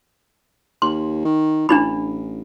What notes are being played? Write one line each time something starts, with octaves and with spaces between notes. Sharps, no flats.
D#2 C6
D#3
A1 D4 E4 B5